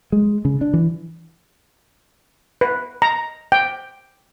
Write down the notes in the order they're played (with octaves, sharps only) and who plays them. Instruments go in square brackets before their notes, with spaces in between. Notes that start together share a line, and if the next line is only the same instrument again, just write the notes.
[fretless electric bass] G#3
C#3
D4
E3
[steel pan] B4
A#5
G5